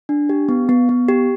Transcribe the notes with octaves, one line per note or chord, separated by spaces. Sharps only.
D4
G4
B3
B3
B3
G4